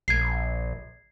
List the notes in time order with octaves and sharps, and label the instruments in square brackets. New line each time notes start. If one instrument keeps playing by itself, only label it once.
[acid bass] A#1 [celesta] G#6 C7